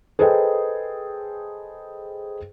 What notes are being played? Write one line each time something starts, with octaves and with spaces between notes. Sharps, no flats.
G#4 A4 B4 C5 D#5 G5